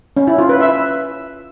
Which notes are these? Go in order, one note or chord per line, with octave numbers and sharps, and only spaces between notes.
C#4
E4
F4
B4
E5